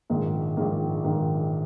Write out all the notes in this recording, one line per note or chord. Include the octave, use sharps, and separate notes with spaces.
A#1 G#2 D#3 A#3
A#1 G#2 D#3 A#3
A#1 G#2 D#3 A#3